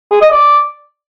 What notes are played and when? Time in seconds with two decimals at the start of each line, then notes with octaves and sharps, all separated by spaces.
0.11 G#4
0.21 D#5
0.32 D5